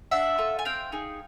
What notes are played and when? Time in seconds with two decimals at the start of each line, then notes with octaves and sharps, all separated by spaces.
0.11 D4 E5 F#5
0.38 F4 A4
0.59 G#5
0.65 C4 F5 G5
0.92 D#4 G#4